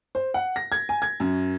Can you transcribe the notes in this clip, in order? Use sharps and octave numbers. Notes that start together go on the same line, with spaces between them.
C5
F#5
A#6
G#6
G#5
G#6
F#2